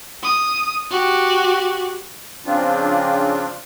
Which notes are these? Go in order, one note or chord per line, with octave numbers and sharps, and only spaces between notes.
D#6
F#4 G4
C#3 F3 C4 D4 F4